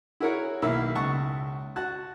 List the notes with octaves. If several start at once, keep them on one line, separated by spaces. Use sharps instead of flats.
E4 F#4 G#4 A#4 C#5 F#5
B1 D#3 A#3 E4 E5 B5
C#2 F#5 A5 C#6
F#4 A5 F#6